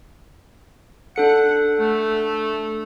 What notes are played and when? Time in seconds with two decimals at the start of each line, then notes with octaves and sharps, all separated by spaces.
1.16 D4 A4 F#5 C#7
1.78 A3